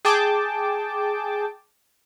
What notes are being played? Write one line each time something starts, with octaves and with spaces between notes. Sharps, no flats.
G#4 G5 A5 D6